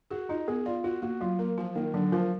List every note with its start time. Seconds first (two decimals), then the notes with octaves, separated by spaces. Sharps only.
0.11 F#4 G#4
0.29 D#4 F4
0.48 B3 G#4
0.66 F4 D5
0.84 F4 F#4
1.02 A#3 F#4
1.21 F#3 F4
1.39 A#3 A#4
1.58 F3 F4
1.75 D#3 A#3
1.94 D3 F#3
2.12 F3 A#4